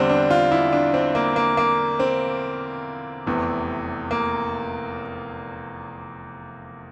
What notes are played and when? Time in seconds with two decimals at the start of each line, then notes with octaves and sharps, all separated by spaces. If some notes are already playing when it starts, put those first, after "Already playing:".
Already playing: E2 D3 G3 C4
0.10 D4
0.31 F4
0.52 E4
0.73 D4
0.94 C4
1.15 A#3
1.36 A#3
1.57 A#3
2.00 C4
3.26 F1 E2 C3 E3
4.11 A#3